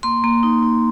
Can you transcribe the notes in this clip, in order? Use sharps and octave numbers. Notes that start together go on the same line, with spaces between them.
A#3 C6
A#3
D#4
D#4